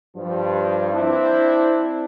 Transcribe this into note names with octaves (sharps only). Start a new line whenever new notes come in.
G2 F3
C4 D4 E4